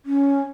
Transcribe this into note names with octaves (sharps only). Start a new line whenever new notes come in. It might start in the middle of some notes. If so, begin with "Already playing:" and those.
C#4